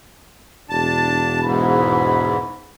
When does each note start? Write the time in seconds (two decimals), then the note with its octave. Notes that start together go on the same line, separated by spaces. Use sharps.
0.70 E1 D4 A5
1.42 E2 G#2 B5